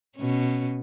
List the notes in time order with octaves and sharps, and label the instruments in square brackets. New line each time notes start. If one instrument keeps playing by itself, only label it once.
[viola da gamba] B2 C#4